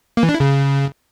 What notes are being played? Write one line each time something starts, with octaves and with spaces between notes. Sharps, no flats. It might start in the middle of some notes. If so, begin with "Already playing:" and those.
A#3
E3
D4
E4
C#3